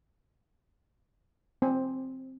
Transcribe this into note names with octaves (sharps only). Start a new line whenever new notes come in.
C4